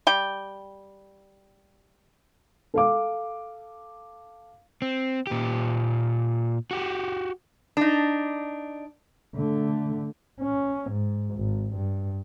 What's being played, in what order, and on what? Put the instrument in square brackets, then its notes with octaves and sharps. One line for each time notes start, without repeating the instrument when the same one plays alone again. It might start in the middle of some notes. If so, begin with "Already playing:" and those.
[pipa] G3 G5
[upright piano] A4 F5 D6
[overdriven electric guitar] C4
A#2 G4
F#4 G4
[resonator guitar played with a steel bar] D4 D#4
[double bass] D3 A3
C#4
G#2
G#1
G2